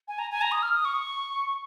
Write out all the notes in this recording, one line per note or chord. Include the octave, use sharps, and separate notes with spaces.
G#5
A#5
G#5
A#5
D#6
F6
D#6
C#6